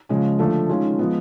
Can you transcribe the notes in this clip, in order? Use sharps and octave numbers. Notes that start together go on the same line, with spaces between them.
C#3 F3 G#3 C#4
D3 F3 A3
D#3 G#3 C#4 F4
F3 G#3 B3